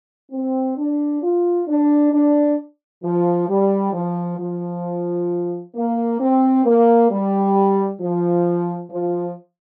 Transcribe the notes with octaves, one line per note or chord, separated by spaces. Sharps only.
C4
D4
F4
D4
D4
F3
G3
F3
F3
A#3
C4
A#3
G3
F3
F3